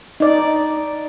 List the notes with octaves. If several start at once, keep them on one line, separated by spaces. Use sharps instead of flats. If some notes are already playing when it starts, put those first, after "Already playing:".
D#4 D5